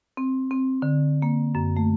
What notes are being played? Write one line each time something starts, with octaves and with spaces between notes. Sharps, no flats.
C4
C4
D3
A#3
F#2
A3